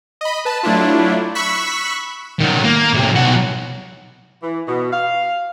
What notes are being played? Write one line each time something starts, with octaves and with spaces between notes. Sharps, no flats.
D#5 B5
B4 A5
F#3 A3 D4 E4 F4
B5 C#6 E6 F#6 B6
D#3 F#3
A#3
A2 C3
B1 F#4
E3
B2
F5